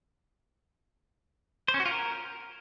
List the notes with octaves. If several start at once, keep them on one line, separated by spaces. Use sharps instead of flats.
C5
C#4
F#4
F4
A#4